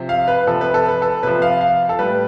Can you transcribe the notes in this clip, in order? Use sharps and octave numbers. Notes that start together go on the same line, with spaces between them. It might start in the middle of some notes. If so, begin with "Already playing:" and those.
Already playing: C3 F3
F5
B4
C3 F3 A4
B4
A4
B4
A4
C3 F3 B4
F5
F5
A4
A2 G3 B4